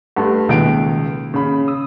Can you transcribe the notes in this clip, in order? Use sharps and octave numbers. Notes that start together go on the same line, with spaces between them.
G2 A3 F#5 A5 C6
C#2 B2 D#3 A#3 D7
C#3 B5
D#6 E6